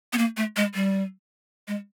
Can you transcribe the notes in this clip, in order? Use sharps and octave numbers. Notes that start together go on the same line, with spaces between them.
B3
A#3
A3
G#3
G3
G#3